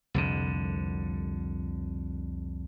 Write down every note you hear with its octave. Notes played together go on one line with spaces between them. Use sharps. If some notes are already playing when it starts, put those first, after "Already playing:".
C2 F2 D3